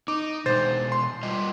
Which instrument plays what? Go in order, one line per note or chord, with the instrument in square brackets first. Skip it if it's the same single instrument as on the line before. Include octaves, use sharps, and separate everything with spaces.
[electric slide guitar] D#4 [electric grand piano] D6
[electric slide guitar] B2 G#3 [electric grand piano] C5 A6
[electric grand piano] C6
[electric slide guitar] G3 F4 D#5